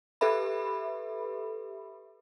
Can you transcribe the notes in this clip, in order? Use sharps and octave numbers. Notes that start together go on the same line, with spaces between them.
G4 A4 B4 E5 B5